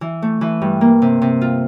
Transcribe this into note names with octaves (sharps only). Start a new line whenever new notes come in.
E3
A3
E3
G2
A#3
C3
C3
F4